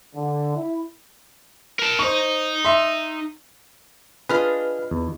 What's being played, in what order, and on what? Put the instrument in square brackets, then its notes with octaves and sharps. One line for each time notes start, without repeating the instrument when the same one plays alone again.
[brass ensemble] D3
E4
[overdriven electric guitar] A#4 A5
[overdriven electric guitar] D#4 [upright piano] C5 C#6
[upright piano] E5 C6
[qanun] D4 F4 D#5 [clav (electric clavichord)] G#4 [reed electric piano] B4 F6
[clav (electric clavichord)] E2